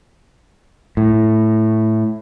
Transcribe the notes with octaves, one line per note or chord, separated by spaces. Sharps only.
A2